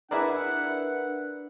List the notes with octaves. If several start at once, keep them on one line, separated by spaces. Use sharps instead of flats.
D4 E4 G#4 A#4 B4 D5 E5 F#5